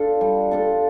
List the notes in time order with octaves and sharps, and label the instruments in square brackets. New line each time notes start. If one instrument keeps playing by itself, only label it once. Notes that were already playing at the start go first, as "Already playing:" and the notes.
Already playing: [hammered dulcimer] D4 F4 A4
G3
D4 F4 A4